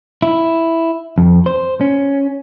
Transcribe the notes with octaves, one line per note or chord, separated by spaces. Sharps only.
E4
F2
C5
C#4